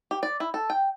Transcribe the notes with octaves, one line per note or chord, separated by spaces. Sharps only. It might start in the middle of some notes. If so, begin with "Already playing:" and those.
G4
D5
E4
A4
G5